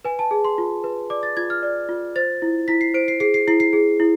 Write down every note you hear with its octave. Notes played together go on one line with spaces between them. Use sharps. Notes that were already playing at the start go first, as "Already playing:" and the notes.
B4 G#5
A5
G#4
C6
F4
B4
D5 D6
A6
F4 G#6
F6
D5
F4
C5 A6
E4
E4 B6
C7
C5 D7
C7
G#4 C7
C7
E4 C7
C7
G#4
E4